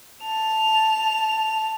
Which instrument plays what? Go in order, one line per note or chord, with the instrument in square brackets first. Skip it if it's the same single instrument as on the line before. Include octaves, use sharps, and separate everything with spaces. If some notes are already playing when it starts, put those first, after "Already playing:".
[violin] A5 F7